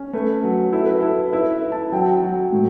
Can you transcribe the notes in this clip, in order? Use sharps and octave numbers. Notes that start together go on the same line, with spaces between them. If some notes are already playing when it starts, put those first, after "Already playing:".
Already playing: C#4
A3 B4
F#3
E4 A4
B4
E4 A4
E4 B4
E4
A5
F#3 G5
F#3
A2